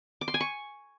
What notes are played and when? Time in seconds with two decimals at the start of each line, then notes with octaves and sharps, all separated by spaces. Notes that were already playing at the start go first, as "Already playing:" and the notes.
0.21 D6
0.28 C6
0.34 G#5
0.41 C#6